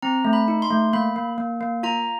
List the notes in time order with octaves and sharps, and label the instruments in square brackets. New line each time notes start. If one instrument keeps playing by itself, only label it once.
[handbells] C4 A#5
A3
B5
D#4
C6
A3
A#3 B5
A#3
A#3
A#3
F4 A#5